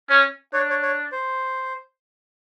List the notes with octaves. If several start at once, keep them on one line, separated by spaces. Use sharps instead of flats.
C#4 C#5
D4 C#5
C#5
C#5
C5